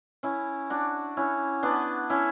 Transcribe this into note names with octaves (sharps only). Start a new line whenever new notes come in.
C#4 E4
D4 F#4
C#4 E4
B3 D4
C#4 E4